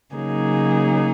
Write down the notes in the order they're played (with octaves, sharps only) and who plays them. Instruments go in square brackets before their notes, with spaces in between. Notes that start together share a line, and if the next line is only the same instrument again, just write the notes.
[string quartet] C#3 F#3 A#3 D#4 G#4